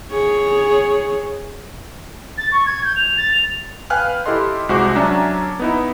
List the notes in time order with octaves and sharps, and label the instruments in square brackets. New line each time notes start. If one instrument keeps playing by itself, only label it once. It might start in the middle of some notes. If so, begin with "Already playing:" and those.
[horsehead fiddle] G#4 C#5
[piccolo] A6
C#6
G#6
G6
F7
A6
F7
[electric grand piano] B4 F5 G5 G#5 F6 F#6
E4 G4 A4 D#5 C6
C2 G#3 F#4 C5 D6
F#3 C#4 D4 E5 A#5
B3 D#4 E4